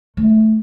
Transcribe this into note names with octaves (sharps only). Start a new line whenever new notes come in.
A3